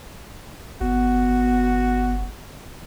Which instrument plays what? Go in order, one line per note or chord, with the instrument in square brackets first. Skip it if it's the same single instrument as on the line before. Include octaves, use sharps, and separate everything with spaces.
[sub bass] G1 [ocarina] B3 [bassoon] F#4